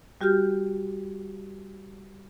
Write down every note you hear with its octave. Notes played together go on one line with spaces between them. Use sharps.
G3 F#4 G4 F6 G6